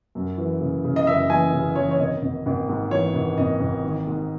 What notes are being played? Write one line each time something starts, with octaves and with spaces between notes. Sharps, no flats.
F#2
E3
C#3
C#3
D#5
F#1 E5
E3 G#5
C#3
E3 C#5
C#5
G#1 D#5
G#1
G#1
G#2
E3 C#5
G#1
G#1 D#5
G#1
D#3
G#2